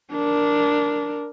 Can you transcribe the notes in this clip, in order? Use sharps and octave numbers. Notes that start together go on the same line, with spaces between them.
D4 A#4